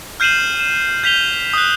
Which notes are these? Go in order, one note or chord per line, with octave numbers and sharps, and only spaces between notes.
F6 G6 C7 D#7 E7 F#7
E7
G6 B6 F7 G7
D#6 F#6